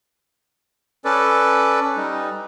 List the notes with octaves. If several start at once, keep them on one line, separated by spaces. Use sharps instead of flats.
C#4 A4 B4 D5
G3 D#4